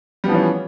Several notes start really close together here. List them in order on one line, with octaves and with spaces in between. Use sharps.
G3 B3 F3 E3 C#4